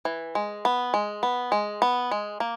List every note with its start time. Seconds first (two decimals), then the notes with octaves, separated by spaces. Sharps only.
0.05 E3
0.35 G#3
0.65 B3
0.94 G#3
1.23 B3
1.52 G#3
1.82 B3
2.11 G#3
2.40 A#3